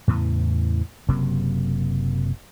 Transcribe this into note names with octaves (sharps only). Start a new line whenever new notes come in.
E2 A2 C#3 E3
F#1 C3 F#3 A#3